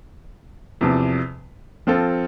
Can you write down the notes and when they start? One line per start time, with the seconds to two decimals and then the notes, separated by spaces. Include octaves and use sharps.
0.81 E2 C3 F3
1.87 F3 C4 F4 A4